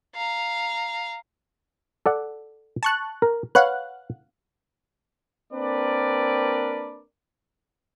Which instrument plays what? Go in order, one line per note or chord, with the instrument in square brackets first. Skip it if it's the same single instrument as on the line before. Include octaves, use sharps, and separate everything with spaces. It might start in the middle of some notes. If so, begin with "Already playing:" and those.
[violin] F5 A#5
[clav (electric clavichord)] A4 D5 F#5
[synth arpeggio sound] A5 C#6 F#6
[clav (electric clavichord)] A#4
[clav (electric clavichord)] B4 C#5 [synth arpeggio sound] F5 F#5 F#6
[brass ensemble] A#3 C4 D4 A#4 B4 D5